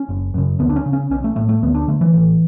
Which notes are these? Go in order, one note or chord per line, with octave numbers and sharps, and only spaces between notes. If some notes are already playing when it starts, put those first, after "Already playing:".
Already playing: C#4
F#1
F#2 C#3
D2 B3
D4
C#4
C#3
C#4
B1 C#4
A3
A2 A3
A3
D2 B3
D4
D3 A3
E3
A1 E3